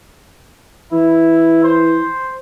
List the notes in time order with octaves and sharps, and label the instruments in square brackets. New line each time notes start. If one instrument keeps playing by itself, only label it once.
[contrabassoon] E3 [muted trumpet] E4
[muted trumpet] C5